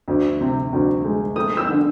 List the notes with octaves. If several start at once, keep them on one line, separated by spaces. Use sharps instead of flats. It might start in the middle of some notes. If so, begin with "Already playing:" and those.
D2
C3
D2
G#3
A3 D#6
E6
D3